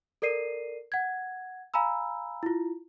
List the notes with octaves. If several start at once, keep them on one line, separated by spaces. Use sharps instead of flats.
A4 A#4 D5 C7 D#7
F#5 G#6
F5 G#5 A#5 B5 E6
E4 F4